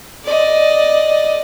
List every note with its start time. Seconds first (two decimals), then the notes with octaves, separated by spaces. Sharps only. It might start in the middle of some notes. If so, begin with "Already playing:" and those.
0.25 D5 D#5